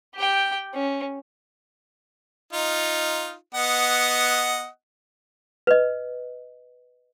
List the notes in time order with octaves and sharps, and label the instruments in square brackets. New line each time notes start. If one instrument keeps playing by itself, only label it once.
[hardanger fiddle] G4 G5
C#4
[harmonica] D#4 F4
B3 D#5 F#5
[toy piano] B4 D#5